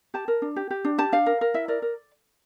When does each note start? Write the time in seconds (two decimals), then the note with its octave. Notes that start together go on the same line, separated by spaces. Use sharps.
0.14 G4 A5
0.28 A#4
0.42 D4
0.56 G4
0.71 G4
0.85 D4
0.98 G4 A5
1.12 D4 F5
1.26 A#4
1.41 A#4
1.54 E4 E5
1.68 A#4 D5
1.82 A#4